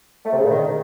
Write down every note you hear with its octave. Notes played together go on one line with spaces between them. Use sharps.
A3
C3
C#3
A#2
D#3